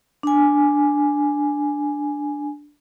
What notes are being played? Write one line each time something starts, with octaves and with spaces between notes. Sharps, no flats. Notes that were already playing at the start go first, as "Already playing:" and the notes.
D4 G#5